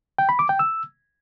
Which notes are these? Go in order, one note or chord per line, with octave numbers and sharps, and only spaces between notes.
G5
B5
D6
G5
E6